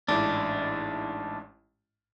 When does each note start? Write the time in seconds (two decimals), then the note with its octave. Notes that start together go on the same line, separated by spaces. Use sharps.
0.09 A1 G#2 D4 E4